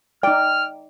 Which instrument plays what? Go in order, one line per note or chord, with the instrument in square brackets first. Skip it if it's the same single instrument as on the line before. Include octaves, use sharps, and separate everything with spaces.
[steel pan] D#4 D5 [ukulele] G5 [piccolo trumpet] F6